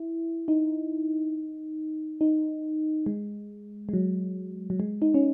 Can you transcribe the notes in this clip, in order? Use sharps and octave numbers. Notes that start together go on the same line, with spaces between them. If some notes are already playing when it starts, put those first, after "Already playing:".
Already playing: E4
D#4
D#4
G#3
G#3
F#3
F#3
G#3
D#4
C#4